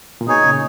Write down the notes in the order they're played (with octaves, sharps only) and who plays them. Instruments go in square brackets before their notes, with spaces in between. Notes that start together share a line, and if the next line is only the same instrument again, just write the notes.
[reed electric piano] A#2
[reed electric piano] B2 [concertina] D#4 G#4 C#5 G#5
[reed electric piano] A#2 C#3